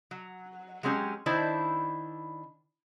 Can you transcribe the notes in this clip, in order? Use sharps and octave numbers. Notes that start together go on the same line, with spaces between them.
F#3
F#3 G#3 C4 C#4 G4
D#3 D4 E4 C5 D5